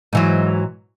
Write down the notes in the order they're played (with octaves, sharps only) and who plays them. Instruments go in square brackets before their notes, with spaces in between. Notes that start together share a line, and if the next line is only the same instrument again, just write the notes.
[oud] G#2 E3 F#3